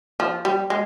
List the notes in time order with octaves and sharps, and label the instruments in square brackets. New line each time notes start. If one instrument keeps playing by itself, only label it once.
[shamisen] F3
G3
G#3